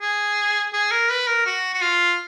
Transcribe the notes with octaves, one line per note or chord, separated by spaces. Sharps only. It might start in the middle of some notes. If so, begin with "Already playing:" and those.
G#4
G#4
A#4
B4
A#4
F#4
F#4
F4